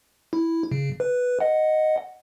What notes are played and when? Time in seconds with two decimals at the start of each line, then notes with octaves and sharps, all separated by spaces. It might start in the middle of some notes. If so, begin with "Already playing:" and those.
0.33 E4
0.72 C#3
1.00 B4
1.40 D#5 F#5